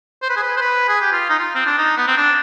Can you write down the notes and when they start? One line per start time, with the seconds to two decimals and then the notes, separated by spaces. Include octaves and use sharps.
0.22 C5
0.29 B4
0.36 G#4
0.43 B4
0.57 C5
0.61 B4
0.88 G#4
1.01 G4
1.12 F4
1.29 D#4
1.39 F4
1.55 C4
1.66 D4
1.78 D#4
1.97 B3
2.07 C4
2.17 D4